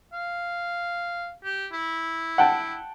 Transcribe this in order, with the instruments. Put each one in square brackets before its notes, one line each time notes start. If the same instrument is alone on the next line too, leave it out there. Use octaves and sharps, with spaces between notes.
[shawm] F5
G4
E4
[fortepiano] F#5 G5 A5